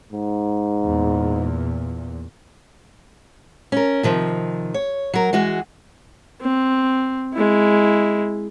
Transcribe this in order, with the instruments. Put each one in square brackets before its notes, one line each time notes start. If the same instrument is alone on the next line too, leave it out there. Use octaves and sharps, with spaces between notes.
[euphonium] G#2
[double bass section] E2 A#2
[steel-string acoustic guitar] C#4 A#4
C3 D#3 F3
C#5
F#3 A#4
E3 G#3 F#4
[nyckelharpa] C4
G#3 E4